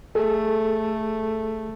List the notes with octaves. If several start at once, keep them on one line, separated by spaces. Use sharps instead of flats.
A3 G#4 A4